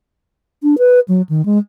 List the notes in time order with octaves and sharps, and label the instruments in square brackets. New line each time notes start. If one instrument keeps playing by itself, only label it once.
[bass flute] D4
B4
F#3
D#3
G#3